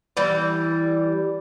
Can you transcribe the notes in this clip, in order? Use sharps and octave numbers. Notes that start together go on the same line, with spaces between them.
E3 G3